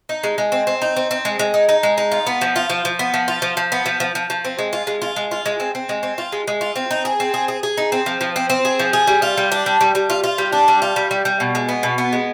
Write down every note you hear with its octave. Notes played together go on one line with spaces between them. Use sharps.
D#4
G#3
G#3
C4
C4
D#4
C4
C4
G#3
G#3
D#4
D#4
G#3
D#4
F4
B3
F3
F4
F3
F3
B3
F3
F4
F3
F3
B3
F3
F3
F3
F3
C4
G#3
F4
G#3
F4
G#3
F4
G#3
C4
C4
G#3
C4
F4
G#3
G#3
F4
C4
D#4
G#4
C4
G#4
G#4
G#4
D#4
C4
F3
F3
C4
C4
G#4
F3
G#4
G3
F4
G3
D4
G3
G3
G3
F4
F4
G3
D4
G3
F4
G3
G3
G3
B2
G#3
B3
B2
B3
G#3